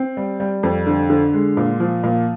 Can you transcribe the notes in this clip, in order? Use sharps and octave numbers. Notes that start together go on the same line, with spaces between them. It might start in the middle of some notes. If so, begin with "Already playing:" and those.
Already playing: C4
G3
G3
F2
D3
D3
G#3
A#2
F3
A#2